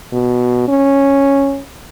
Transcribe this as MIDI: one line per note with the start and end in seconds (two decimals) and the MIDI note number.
0.13 0.64 47
0.68 1.61 61